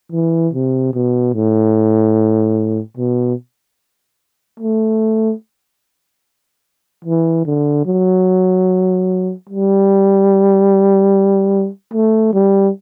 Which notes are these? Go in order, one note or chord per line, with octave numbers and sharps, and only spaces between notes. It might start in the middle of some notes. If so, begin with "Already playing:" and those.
E3
C3
B2
A2
B2
A3
E3
D3
F#3
G3
A3
G3